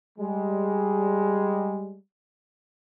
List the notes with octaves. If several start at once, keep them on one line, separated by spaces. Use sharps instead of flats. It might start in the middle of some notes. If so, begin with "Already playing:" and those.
G3 G#3